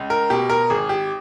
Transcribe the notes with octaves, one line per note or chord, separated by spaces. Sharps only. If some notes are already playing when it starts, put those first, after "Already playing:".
Already playing: C#2
A#4
B2 G4
A#4
G#1 G#4
G4